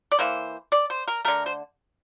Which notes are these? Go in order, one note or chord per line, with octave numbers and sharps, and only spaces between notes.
D5
E3 A#3 C5
D5
C5
A#4
D3 A3 A#4
C5